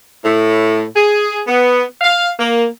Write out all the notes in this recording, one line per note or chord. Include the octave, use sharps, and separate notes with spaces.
A2
G#4
B3
F5
A#3